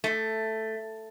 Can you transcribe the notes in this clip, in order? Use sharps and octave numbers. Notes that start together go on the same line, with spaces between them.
A3